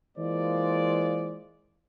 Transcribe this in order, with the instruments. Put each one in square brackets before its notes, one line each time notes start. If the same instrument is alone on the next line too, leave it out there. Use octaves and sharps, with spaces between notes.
[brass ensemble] E3 G#3 A#3 F4 C5 D5